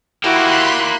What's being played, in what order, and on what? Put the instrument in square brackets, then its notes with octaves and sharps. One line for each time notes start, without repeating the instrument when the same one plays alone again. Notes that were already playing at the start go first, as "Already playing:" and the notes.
[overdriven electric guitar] A#3 G4 [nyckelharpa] E4 F#4 [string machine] B5 C6 F#6